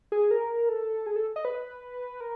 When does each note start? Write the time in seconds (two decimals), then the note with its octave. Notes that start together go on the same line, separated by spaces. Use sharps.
0.12 G#4
0.31 A#4
0.69 A4
1.06 G#4
1.16 A4
1.36 D#5
1.45 B4
2.21 A#4